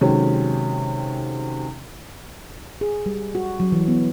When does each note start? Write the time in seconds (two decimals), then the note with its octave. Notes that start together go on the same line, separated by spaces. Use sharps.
0.01 C3 D#3 F#3 G#3 C#4 A4
2.81 G#4
3.06 G3
3.35 F#4
3.60 F#3
3.72 E3
3.88 B3